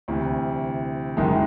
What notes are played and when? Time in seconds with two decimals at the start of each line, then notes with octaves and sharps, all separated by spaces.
0.08 D2 C3 E3
1.17 F#1 F#2 D#3 G#3